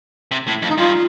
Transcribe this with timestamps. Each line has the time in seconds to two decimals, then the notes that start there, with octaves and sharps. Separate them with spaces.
0.31 C3
0.48 A2
0.62 F2
0.69 D#4
0.78 G2 F4